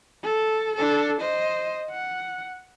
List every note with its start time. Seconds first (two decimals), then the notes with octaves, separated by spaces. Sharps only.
0.23 A4
0.76 D4 A4
1.21 C5 D#5
1.90 F#5